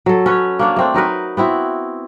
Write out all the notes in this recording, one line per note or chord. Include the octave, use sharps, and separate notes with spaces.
F#3 A4
C#4 B4 C#5
A#3 D4 C#5
A3 C4 D4
F#3 D#4 A#4 B4
B3 C4 E4 F#4